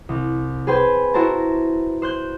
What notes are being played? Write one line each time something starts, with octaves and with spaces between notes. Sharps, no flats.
C2
G#4 B4 C5 G5 G#5
E4 F#4 A#4 C5 A5 A#5
C5 F#6 G6